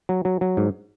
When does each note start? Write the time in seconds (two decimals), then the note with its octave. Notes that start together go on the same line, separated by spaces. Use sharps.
0.09 F#3
0.25 F#3
0.41 F#3
0.57 G#2